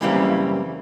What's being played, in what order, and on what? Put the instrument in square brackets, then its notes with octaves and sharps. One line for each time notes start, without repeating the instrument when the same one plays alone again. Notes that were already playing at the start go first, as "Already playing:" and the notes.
[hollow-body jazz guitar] F#2 C#3 E3 G3 A#3 C4